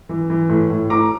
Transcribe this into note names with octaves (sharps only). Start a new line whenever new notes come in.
E3
E3
A2
A2
A2 A#5 D6